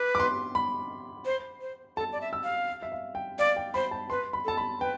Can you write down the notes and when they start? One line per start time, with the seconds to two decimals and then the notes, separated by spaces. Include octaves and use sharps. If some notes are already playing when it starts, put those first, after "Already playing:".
Already playing: B4 D6
0.15 D6
0.20 C6
0.55 B5
1.25 C5
1.61 C5
1.97 A4 A5
2.12 D5
2.21 E5
2.33 E6
2.44 F5
2.83 E5
2.92 F5
3.15 G5
3.39 D5 F5
3.57 G5
3.74 C5 B5
3.91 A5
4.10 B4 C6
4.33 B5
4.45 A4 A5
4.57 B5
4.80 B4 G5